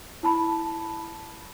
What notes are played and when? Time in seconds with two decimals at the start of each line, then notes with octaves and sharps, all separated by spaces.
0.23 E4 A5 B5